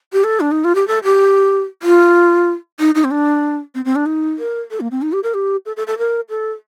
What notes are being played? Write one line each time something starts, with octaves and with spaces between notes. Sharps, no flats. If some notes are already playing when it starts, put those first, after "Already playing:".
G4
A4
D4
D#4
F4
G4
A4
G4
F4
D#4
D#4
C4
D4
C4
C4
D4
D#4
A#4
A4
A#3
C4
D#4
G4
A#4
G4
A4
A4
A4
A#4
A4